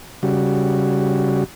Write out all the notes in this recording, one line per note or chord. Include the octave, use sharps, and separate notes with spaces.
C#3 G3 F#4